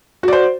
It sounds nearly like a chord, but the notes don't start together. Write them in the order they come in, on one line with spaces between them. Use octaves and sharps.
F#4 D5 C5